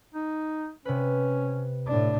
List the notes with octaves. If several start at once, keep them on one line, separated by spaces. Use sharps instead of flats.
D#4
C3 C#4 B4
A2 D4